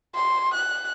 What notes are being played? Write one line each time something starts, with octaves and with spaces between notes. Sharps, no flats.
C6
F#6